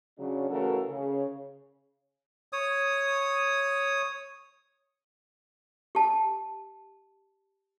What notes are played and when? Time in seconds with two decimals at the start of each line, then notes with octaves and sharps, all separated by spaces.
0.19 C#3 F#3 D4
0.50 C#3 E3 A3 F#4 A4 A#4
0.89 C#3
2.53 C#5 D#6
5.95 G4 A5